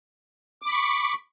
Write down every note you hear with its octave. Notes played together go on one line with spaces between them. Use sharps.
B5 C#6 D6